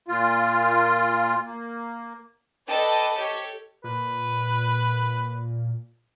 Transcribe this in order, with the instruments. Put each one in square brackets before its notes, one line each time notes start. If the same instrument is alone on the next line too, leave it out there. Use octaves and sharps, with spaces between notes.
[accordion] A#2 F4
A#3
[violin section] A4 B4 D5 D#5 G5 A5
G4 A4 C#5
[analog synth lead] A#2 [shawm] B4